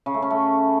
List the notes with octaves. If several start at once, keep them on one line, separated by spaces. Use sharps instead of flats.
C#3
A3
C#4
A3